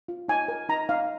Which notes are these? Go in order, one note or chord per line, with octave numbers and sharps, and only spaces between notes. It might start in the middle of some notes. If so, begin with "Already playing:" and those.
F4
D#4 G#5
A#4
D#4 A#5
D#4 F5